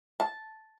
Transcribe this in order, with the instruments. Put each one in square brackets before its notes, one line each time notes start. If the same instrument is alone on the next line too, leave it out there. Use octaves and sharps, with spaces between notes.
[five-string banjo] A5